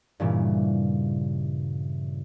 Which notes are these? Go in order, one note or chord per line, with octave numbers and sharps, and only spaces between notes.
G2 A#2 C#3 E3